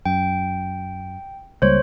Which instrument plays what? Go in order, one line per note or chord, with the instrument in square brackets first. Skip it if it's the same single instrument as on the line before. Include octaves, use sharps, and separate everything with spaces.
[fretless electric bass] F#2 [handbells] G5
[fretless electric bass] C#2 G3 A#3 [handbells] C5 C#5